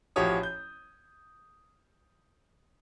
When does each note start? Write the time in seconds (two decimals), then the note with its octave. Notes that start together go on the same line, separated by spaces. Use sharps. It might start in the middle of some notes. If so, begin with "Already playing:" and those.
0.16 A1 F3 F#4 G4 C#5 D#6
0.43 G6